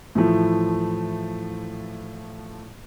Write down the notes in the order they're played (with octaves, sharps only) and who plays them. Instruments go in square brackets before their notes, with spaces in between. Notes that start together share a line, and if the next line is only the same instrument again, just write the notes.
[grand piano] A2 E3 F3 A3